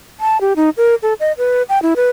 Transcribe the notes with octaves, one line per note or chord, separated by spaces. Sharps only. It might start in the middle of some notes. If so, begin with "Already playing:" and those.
A5
G4
D#4
A#4
A4
D#5
B4
G5
E4
B4